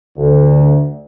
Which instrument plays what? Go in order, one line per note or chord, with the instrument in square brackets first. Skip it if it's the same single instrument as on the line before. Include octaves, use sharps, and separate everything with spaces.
[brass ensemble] D2